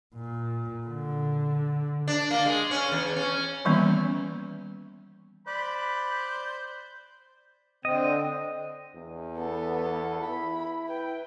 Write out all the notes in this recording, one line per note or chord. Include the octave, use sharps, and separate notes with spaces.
A#2
D3
D4
A#3
G#3
C#4
E2
C#4
D#3 E3 G3 A#3 B3 C#4
C5 D5 B5 D6 F#6
D3 C4 D#5
E2
B3 A4
E4 B5
B4 G5